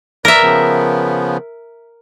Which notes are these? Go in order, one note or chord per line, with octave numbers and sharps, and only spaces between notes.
A#4 B4 D5 E5
C#3 F3 B3